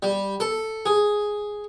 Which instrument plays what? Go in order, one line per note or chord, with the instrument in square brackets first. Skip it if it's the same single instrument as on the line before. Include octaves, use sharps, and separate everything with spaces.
[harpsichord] G3
A4
G#4